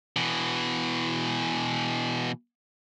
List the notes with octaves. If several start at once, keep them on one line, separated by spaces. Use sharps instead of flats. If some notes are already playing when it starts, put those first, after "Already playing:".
B2 E3